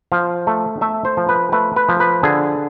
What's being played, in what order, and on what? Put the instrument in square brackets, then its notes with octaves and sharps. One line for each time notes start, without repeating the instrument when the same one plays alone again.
[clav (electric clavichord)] F3 F5
A3
A3 E5
C5
F3
B4
A3 B4
B4
F3
B4
D3 G#4